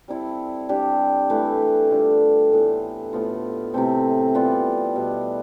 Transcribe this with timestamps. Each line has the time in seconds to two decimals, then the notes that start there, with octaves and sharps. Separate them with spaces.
0.08 G3 C4 E4 A4
0.69 G3 D4 G4
1.30 E3 A3 E4 B4
1.90 D3 G3 D4 F4
2.52 A2 E3 B3
3.13 A2 F3 B3 F4
3.74 C3 E3 A3 C4
4.34 E3 G3 B3 F4
4.95 B2 G3 B3 E4